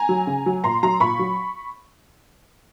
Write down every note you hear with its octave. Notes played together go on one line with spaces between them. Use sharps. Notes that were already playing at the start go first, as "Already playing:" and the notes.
Already playing: G#5 A#5
F#3
C#3
F#3
A#2 A#5 C6
F#3 A#5 C6
A#2 B5 C#6
F#3